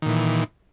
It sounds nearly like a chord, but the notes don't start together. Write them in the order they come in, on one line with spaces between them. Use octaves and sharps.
D#3 A#2 E3